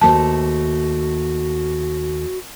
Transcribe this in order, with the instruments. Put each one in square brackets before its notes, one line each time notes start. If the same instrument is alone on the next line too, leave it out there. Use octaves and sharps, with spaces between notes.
[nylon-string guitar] D#2 A3 C5 [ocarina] F#4 [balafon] A5